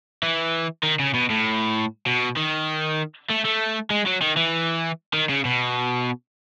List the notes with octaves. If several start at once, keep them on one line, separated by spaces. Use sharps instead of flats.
E3
D#3
C#3
B2
A2
B2
D#3
A3
A3
G#3
F#3
D#3
E3
D#3
C#3
B2